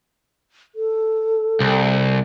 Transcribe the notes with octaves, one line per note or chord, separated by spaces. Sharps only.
A4
C2